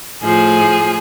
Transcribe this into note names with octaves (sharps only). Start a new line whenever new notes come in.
A2 F3 G#4